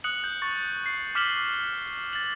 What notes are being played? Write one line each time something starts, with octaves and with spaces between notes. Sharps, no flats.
D#6 F#6 C#7 F#7
G6
C#6 A6
C7
D6 F6 B6 E7 F#7 G7
A6 F#7